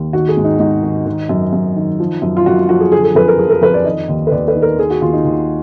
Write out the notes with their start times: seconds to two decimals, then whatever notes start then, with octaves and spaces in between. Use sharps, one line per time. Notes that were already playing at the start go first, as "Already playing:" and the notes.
Already playing: D#2
0.13 D#3 F#4
0.28 G#4
0.37 G#2
0.44 D#4
0.59 G#2 D#4
0.83 D#3
1.06 D#3
1.29 F#2
1.53 F#2
1.76 D#3
2.00 F3
2.22 F#2
2.37 F4
2.46 F#2 F#4
2.69 F3 F#4
2.80 G#4
2.92 D3 G#4
3.04 G#4
3.15 F2 B4
3.28 A#4
3.38 F3 G#4
3.50 A#4
3.62 F2 B4
3.74 D5
3.85 D#3 D#5
4.08 D#2
4.27 B4
4.31 D#2 D5
4.48 B4
4.55 D#3
4.62 A#4
4.78 D#3 G#4
4.90 F#4
5.01 D#2 F4
5.13 D#4
5.25 D#2